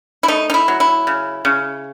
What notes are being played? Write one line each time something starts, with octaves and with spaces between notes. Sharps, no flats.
E4
A3 D#4
D#4
E4
F#3
E4
C#3
C#3